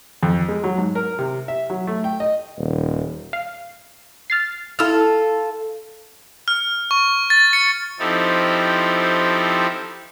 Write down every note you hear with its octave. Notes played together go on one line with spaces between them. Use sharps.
F2
G#3
F#3
G#2
A#4
C3
E5
F#3
A3
G5
D#5
D#1
F5
F6 A6 C7
E4 F4 A4 E6 F6
F6
C#6
A6
C#7
F3 C4 D#4 E4 G4 A4